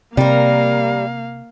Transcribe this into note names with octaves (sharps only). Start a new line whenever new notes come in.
C3 G3 A#3 A#4 F5